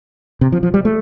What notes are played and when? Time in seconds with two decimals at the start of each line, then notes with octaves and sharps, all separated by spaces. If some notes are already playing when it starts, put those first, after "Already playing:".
0.41 C3
0.52 F3
0.63 F3
0.74 G3
0.85 A3